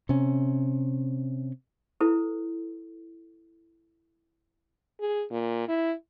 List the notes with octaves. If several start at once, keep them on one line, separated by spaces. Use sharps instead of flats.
C3 C#4
E4 A4 B4
G#4
A#2
E4